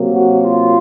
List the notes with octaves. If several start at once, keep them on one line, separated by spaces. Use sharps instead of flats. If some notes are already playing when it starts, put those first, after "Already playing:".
Already playing: C3 F#3 A#3
F#4
F4